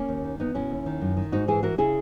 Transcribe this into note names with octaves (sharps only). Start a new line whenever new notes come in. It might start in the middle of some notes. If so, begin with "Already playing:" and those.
Already playing: A#3 C#4
D#2
D#3
E2 B3 D#4
B2 C#4 E4
D#2
D#3
F#2
D#3
G#2 D#4 F#4
E3 E4 G#4
E3 F#4 A#4
C#3 E4 G#4